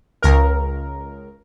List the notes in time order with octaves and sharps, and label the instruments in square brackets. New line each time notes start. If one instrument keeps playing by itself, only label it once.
[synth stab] C#2 A#4